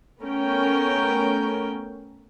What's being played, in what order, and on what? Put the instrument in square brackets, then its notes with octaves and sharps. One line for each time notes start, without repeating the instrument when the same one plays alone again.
[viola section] A3 B3 C#4 A#4 G5